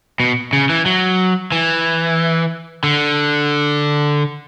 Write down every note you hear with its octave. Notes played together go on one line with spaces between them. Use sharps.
B2
C#3
E3
F#3
E3
D3